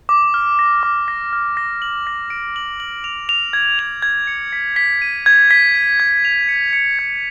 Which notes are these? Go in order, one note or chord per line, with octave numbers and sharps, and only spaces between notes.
D6
F6
A#6
D6
A#6
F6
A#6
F#7
A#6
D7
F#7
F#7
F7
F7
G#6
F7
G#6
C#7
B6
B6
D#7
G#6
B6
D#7
G#6
F7
C#7
C#7
G#6